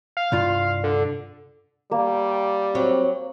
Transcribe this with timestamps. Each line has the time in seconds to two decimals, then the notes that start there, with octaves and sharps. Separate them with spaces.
0.17 F5
0.32 C2 G2 F4
0.84 D3
1.91 G3 A#3
2.75 F#3 C4